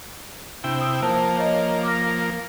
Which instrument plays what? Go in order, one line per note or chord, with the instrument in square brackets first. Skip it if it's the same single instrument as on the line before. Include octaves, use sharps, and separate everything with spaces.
[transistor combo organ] C3 E4 G5 [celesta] D4 G6
[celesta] D#6
[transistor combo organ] F3 A#3 [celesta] C5 A5
[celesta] C#5 D#5 A#5
D6 F6 A#6